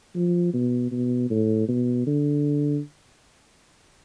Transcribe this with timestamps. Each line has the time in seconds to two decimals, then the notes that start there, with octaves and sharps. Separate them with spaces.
0.15 F3
0.53 B2
0.91 B2
1.30 A2
1.69 B2
2.07 D3